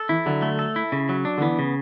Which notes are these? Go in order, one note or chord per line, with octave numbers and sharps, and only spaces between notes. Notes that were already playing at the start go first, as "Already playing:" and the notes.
Already playing: A4
E3 E4
D3 F#3
A3
A4
E4
C#3
F#3
D4
D3
E3 B3
C#3